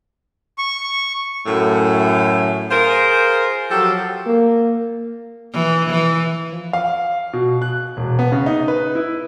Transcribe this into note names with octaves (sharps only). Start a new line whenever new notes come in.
C#6
F#2 A2
F4 G#4 A#4 C5
F3 F#3 G4 A4
A#3
E3
E3
F3
F5
B2
F#6
E1
B3
C#3
D#4
B4
E4